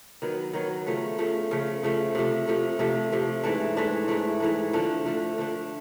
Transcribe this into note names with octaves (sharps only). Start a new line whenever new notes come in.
D#3 F#3 B3
D#3 F#3 B3
C#3 F3 A3
C#3 F3 A3
C#3 F3 A3
C#3 F3 A3
C3 F3 A3
C3 F3 A3
C3 F3 A3
C3 F3 A3
G#2 E3 A3 D4
G#2 E3 A3 D4
G#2 E3 A3 D4
G#2 E3 A3 D4
D3 F3 A3 D4
D3 F3 A3 D4
D3 F3 A3 D4